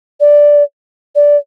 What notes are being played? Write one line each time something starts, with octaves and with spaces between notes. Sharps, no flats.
D5
D5